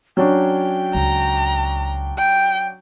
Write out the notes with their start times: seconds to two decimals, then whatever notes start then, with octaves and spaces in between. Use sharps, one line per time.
0.17 F#3 C#4 D4 G5
0.95 C#2 A#5
2.18 G5